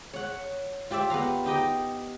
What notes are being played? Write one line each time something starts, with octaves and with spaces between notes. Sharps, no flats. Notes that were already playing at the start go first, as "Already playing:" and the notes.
C#5 F#5
F4 G4 D5 E5
B3 G4 F5 A#5
D#4 G4 D#5 G5